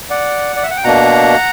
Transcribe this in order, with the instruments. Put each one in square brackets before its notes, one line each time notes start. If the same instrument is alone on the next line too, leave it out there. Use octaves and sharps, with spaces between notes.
[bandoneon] D5 F#5
D5
E5
F#5
G5
B2 A#3 D4 F#5 A#5